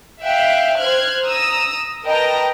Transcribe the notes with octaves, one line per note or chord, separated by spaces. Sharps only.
E5 F5 G5 F#6
C5 F6 F#6 G#6
A#5 D#6 E6
A#4 B4 D#5 G5 A5 A#5